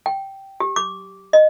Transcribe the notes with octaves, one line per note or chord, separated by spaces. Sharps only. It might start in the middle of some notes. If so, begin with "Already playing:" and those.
G5
G4
D6
D#5